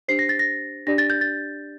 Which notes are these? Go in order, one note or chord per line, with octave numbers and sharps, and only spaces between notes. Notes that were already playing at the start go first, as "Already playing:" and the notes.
D4 G4 C5 C7
A#6
A6
A#6
D4 G4 D5 A#6
A6
G6
A6